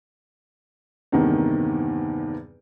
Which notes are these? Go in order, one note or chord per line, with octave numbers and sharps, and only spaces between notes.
E2 G2 C3 D#3 A#3